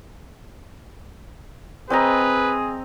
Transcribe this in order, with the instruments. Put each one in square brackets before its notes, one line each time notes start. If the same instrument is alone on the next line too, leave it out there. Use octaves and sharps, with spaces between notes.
[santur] C4 D#5 A#5 [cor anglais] G#4 [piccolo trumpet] B4